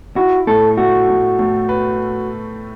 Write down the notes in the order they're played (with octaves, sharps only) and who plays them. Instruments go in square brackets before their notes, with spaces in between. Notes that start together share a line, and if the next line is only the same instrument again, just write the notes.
[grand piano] E4 [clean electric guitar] F#4
[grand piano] A2 [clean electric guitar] A4
[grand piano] A3 [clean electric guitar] F#4
[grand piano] A2
A2
B4